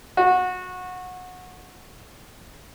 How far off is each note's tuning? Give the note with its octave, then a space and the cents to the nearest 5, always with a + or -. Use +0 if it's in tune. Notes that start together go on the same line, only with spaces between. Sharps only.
F#4 -20